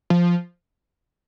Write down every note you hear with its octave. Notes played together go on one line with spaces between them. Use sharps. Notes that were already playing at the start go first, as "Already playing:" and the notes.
F3